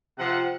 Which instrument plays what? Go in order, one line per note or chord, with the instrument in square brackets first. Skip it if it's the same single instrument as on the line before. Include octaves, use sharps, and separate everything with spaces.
[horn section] C3 F3 F#5